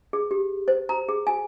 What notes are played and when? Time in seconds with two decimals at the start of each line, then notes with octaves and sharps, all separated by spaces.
0.13 G#4
0.31 G4
0.68 C5
0.89 A#5
1.09 G#4
1.27 G#5